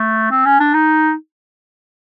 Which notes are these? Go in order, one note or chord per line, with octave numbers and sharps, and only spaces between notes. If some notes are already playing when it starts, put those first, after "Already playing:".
Already playing: A3
C4
C#4
D4
D#4